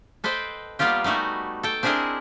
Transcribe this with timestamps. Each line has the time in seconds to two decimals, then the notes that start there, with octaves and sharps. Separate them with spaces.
0.24 A4 B4 C5 D#5 G5
0.79 G3 A#3 B3 F4 G4
1.04 G3 A3 D#4 F#4 G#5
1.63 A4 G5
1.83 C4 D4 E4 G#4 A#4 D#5